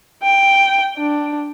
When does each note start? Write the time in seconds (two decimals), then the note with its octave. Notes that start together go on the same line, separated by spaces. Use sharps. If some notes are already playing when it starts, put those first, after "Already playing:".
0.23 G5
0.97 D4